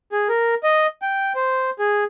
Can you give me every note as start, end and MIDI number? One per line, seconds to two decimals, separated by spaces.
0.12 0.28 68
0.29 0.55 70
0.63 0.87 75
1.02 1.33 79
1.35 1.70 72
1.79 2.04 68